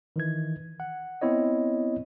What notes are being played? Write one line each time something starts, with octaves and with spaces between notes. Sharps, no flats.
D#3 E3 G#6
F#5
B3 C4 E4 C#5 D#5